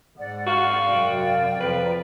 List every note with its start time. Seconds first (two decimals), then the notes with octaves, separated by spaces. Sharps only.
0.18 G#2 D5 F#5
0.47 F#4 F5
0.88 F#2 C3 D5 G5
1.60 F2 B4